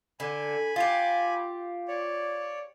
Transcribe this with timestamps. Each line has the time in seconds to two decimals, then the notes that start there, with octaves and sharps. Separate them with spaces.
0.20 D3 G#5 B5
0.76 F4 G4
1.88 C#5 D5